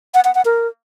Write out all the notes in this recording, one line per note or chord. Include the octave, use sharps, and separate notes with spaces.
F#5
F#5
F#5
A#4